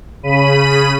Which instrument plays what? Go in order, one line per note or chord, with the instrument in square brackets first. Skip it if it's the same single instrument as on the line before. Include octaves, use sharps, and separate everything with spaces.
[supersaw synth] C#3 B5 D#7